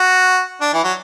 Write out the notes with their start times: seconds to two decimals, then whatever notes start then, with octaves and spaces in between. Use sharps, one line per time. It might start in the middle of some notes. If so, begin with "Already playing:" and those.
Already playing: F#4
0.61 D4
0.73 E3
0.84 F#3